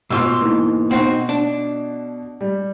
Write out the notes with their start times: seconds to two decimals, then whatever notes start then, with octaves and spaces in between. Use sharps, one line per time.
0.10 G#2 B2 F4 E6
0.40 E3 A#3 D#4
0.91 B2 C4 D#4 F#4 F#5 C7
1.29 D4
2.41 G3